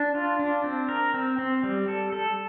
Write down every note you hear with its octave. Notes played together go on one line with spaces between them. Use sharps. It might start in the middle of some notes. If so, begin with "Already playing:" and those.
Already playing: D4
F4
D4
C4
A#4
C4
C4
G3
A4
A4